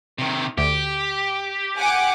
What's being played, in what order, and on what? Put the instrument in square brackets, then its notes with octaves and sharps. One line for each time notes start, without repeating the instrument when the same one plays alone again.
[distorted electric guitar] C3 D#3
[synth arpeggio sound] D2 [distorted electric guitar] G4
[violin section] F#5 G#5 D6